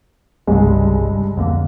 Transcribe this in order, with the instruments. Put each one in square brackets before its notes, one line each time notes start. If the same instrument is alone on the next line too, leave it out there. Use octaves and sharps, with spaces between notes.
[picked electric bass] G1 C2 C#3 [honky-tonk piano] G2 G#3
[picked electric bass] F2 D3 A#3